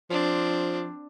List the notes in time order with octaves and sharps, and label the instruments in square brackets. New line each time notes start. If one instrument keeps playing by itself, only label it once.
[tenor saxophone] F3 [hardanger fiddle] C4 D4